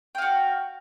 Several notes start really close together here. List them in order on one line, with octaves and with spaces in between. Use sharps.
G5 F5 F#4